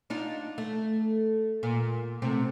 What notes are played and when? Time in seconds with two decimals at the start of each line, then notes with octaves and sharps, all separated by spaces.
0.10 D4 D#4 F4
0.58 A3
1.63 A#2
2.22 C3 A3 C4